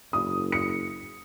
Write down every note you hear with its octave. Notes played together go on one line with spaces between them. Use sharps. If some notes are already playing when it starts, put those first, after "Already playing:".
F#1 D#6
C#7